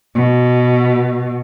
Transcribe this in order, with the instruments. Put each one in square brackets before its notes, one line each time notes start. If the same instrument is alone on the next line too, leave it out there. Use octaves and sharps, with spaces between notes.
[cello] B2